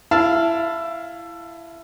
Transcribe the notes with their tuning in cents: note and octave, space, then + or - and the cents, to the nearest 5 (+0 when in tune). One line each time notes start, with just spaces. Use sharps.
E4 +20 F5 +0 A5 +0